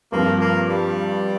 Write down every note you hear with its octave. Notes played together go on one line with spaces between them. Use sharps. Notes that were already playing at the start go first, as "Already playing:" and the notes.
G2 F3 A#3 C4
A#3
G3